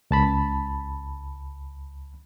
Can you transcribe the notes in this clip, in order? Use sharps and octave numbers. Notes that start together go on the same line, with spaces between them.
C#2 A5 B5